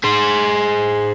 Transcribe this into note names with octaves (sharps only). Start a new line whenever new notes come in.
G#4 C5